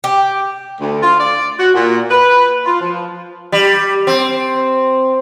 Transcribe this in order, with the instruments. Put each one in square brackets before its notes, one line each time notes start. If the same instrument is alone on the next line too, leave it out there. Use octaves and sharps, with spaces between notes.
[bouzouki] G4
[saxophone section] D2
F4
D5
F#4
A#2
B4
F4
F3
[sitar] G3
C4